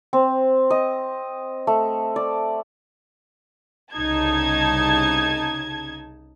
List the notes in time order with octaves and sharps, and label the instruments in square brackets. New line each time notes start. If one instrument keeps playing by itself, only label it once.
[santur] C4
D#5
A3
D5
[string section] C2 C#3 D#4 A5 G#6